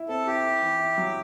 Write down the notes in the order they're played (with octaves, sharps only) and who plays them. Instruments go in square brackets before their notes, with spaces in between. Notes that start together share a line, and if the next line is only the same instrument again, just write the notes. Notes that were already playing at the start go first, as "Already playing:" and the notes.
Already playing: [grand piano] E4
[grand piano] C4 [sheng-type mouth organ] A4
[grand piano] E4 [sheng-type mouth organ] G4
[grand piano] E4
E3
E4
F#3